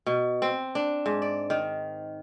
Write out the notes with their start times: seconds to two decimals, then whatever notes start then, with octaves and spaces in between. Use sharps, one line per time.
0.06 B2
0.42 C4
0.75 D4
1.06 G#2
1.22 D5
1.50 D#3